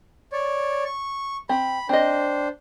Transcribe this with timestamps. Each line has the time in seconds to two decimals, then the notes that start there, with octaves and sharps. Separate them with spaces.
0.32 C#5 D5
0.85 C#6
1.49 C4 B5
1.89 C4 D4 C5 D#5